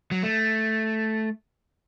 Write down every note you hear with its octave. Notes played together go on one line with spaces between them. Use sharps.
F#3
A3